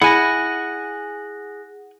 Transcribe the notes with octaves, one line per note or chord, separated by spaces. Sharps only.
E4 G#4 F#5 G#5 F#6 A#6